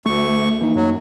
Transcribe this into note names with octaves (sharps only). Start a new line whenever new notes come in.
D2 A3 C#6
E3 A#3 D#4
F#2 F#3